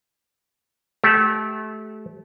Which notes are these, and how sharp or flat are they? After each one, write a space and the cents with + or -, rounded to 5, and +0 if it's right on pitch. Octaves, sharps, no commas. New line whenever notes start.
A3 -25 G4 -15